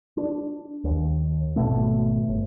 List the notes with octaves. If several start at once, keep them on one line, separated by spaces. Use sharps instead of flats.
D4
D#2
G#1 B2 A3
G1